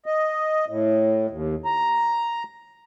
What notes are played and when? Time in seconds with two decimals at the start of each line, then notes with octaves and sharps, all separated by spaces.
0.06 D#5
0.68 A2
1.30 D#2
1.65 A#5